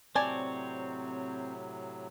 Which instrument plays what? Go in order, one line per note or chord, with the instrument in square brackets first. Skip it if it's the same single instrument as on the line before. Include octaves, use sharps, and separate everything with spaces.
[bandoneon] A2 C3 F#3 [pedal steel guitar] C4 C#5 [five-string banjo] D5 G#5 A5